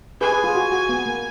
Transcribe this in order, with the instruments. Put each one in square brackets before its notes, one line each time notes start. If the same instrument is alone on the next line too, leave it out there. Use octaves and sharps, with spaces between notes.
[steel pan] G#4 B4 [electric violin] G#5
[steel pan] G#4 B4
F4 G#4
F#4
F#4
B3
A#3